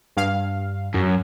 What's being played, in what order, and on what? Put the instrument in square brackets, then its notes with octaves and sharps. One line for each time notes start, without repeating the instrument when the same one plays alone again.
[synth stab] G2 F5
[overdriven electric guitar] F#2